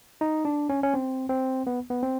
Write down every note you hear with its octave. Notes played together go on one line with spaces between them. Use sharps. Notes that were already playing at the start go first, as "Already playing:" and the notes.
D#4
D4
C#4
C#4
C4
C4
B3
B3
C4